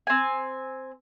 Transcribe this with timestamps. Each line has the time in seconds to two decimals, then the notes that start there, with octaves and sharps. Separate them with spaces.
0.07 C4 G#5